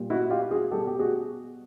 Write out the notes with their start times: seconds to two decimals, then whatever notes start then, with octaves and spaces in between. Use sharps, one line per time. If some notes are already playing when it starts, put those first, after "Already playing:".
Already playing: A#2 G3
0.10 E4 F#4
0.30 F4 G4
0.51 F#4 G#4
0.71 B2 G3 G4 A4
0.87 G4
0.99 F#4 G#4